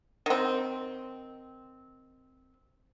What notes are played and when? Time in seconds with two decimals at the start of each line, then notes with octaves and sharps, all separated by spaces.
0.26 D#3 C4